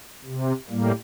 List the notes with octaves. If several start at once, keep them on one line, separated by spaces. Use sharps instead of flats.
C3
A2 G3 A#3